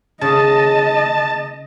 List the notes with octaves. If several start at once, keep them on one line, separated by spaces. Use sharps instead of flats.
C#3 D#5 A5